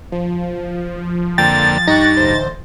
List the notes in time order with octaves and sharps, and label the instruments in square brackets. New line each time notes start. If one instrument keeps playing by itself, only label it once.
[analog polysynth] F3
[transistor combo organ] F2 D3 A#3 [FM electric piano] G5 [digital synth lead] A6
[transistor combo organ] G2 [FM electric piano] D#4 A#6 [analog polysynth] G5 C#6 F#6
[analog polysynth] A1 D2 C5